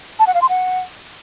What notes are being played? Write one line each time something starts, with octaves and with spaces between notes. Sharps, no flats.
A5
F#5
F5
C6
F#5